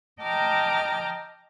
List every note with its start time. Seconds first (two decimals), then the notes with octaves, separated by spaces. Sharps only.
0.21 D#5 G5 A5 A#5 D6 F6